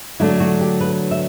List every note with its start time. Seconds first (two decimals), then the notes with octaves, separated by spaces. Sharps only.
0.20 D3 F#3 A3 D4 E4
0.40 F#4
0.61 G4
0.81 B4
1.11 E5